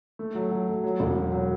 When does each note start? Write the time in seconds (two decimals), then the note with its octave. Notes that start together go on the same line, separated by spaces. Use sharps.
0.19 A3
0.35 F#3
0.51 F#3
0.68 A3
0.84 F#3
1.00 E1
1.16 F#3
1.32 F#3